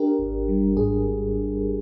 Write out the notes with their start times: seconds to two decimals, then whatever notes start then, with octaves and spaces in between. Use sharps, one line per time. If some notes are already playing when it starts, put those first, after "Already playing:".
Already playing: D4 G4 A#4
0.19 G#1
0.48 G3
0.77 G#2 G#4